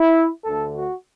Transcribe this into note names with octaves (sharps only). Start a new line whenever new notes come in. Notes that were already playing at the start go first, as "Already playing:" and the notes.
Already playing: E4
D2 D3 A3 A4
F#4